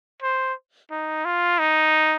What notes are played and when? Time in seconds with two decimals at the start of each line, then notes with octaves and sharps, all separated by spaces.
0.23 C5
0.91 D#4
1.25 F4
1.59 D#4